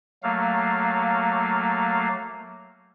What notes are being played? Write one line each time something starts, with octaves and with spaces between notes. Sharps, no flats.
F#3 A3 A#3 F5